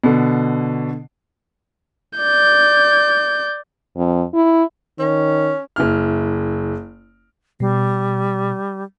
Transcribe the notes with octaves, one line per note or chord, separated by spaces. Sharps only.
B2 D3
D5 G6
F2
E4
D#3 C#4
F#1 E4 F6
B2 G3